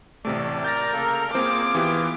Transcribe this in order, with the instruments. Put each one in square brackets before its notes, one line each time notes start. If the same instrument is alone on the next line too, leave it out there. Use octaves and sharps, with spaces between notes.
[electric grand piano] A1 C3 A3 [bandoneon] D5 D6
[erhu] A#4 [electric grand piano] G6 A6 A#6
[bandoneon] C#3 A#3 A4
[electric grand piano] A#3 C4 C5 [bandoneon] F4 G#4 [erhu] D6
[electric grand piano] E3 B3 G4